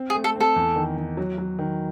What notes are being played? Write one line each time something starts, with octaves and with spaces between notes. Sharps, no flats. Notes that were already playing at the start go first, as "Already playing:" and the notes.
Already playing: C4
G#4
A3
A4
C4 A4
E2
D#3
D#3
F#3
F#3
D#3